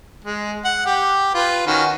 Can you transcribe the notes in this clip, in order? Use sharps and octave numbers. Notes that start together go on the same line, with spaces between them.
G#3
F#5
G4
F4 B4
D#3 C#4 F#4